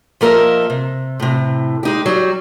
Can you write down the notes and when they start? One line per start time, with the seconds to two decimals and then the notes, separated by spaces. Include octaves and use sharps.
0.21 F3 A#3 A#4 D#5 E5
0.70 C3
1.20 A2 C3
1.83 G#3 D#4 G4
2.06 F#3 G3